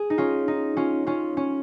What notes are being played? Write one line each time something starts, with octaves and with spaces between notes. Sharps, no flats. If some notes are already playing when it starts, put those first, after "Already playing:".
Already playing: G#4
D#4
C#4 F4
D#4
C#4 F4
C#4 F4
C#4